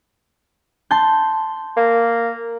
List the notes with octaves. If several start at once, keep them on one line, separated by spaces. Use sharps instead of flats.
A5 C6 G6
A#3